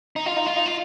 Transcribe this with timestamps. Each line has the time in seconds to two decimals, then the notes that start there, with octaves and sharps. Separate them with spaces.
0.16 D#4
0.26 F4
0.36 D#4
0.46 F4
0.56 D#4
0.66 F4